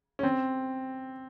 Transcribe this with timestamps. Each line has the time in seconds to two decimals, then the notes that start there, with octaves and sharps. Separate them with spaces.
0.19 C#4
0.23 C4